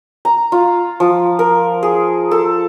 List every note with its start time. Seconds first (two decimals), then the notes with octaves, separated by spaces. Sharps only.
0.25 A#5
0.52 F4
1.00 F3
1.39 A#4
1.83 G#4
2.31 A4